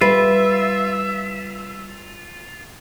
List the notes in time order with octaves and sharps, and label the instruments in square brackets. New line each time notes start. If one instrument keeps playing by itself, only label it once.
[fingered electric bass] G3 [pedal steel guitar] F4 [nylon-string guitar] B4 [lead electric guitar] E5